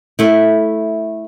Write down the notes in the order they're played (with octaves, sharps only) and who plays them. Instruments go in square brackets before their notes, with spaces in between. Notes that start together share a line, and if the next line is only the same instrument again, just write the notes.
[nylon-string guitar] A3 E4